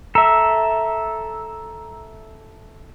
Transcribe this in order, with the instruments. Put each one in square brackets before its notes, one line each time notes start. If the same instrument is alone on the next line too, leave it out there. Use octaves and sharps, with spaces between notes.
[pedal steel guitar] A4 E5 [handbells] A#5